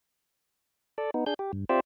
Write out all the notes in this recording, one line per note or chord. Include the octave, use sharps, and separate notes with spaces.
A4 D5
B3 D#4
D4 G#4 G6
G4
G2
C4 F4 G4 C5 D5 E5